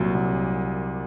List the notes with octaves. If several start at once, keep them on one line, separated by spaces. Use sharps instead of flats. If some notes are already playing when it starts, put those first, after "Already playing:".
Already playing: C2 A#2 F#3
C2